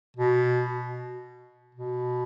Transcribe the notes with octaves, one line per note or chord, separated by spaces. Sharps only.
B2
B2